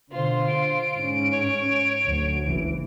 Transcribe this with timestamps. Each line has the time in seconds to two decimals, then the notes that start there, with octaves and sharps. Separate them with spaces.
0.12 B2 D3 F4 C5
0.48 D7
0.95 G#2 C#4
1.32 C#5
2.04 D2 F#3
2.45 F#1 C#2 E3